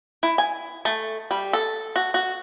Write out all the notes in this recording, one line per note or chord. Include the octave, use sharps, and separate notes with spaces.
E4
G#5
A3
G3
A4
F#4
F#4